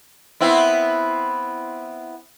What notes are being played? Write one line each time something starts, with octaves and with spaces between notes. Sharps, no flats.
B3 C4 E4